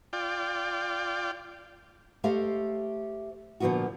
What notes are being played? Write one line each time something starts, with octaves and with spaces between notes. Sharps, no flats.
F4 D5 G5
A3 G4 A4 C5 D#5 F5
A#2 D3 F3 B3 F4 F#4